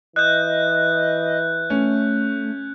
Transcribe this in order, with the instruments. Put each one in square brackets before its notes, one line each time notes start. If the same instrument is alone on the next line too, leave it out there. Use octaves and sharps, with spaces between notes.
[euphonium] E3 [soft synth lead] D#5 [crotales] F#6 G6
[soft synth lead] A3 [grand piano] C#4